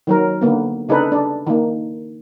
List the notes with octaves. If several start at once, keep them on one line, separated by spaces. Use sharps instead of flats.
D#3 F#3 A#4
D3 A#3 B3
C#3 D4 D#4 G#4 A4 B4
D4
D#3 A#3